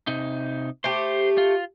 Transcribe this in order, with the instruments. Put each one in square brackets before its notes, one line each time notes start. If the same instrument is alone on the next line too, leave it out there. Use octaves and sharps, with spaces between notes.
[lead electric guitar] C3 D#4
[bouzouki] A3 G4 [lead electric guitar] C5
[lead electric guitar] F4